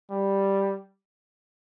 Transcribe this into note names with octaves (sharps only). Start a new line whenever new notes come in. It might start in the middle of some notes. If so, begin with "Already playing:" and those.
G3